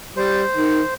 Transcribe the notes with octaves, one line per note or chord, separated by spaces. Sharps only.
G3 C5
D#3